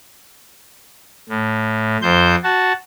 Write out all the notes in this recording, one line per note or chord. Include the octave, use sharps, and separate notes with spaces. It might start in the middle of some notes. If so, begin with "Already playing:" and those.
A2
F2 C5 G6
F#4 A5